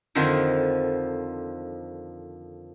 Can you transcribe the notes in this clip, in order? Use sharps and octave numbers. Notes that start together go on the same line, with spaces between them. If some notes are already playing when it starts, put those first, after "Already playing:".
F2 D3 D#3 F3 D#4